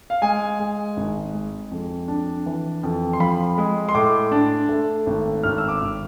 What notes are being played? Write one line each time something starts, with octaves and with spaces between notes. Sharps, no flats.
F5
G#3 G#5
G#3
G#1
G#3
F2
D4
E3
F2
C6
F3 B5
G#3
C6
A2 D6
D4
A3
G#1
G#1 F6
E6
D6
G#1